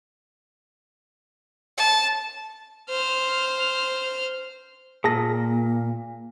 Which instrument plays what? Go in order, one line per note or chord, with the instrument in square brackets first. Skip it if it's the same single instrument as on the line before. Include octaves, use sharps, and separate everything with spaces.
[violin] A5
[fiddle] C5 F6
[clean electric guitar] A#2 [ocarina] A#3 [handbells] G#4 A5 A#6